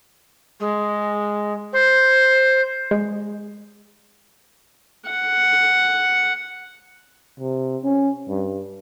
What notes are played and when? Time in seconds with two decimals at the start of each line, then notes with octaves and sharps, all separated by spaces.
0.60 G#3
1.73 C5
2.91 G#3
5.09 F#5
7.39 C3
7.83 C#4
8.29 G2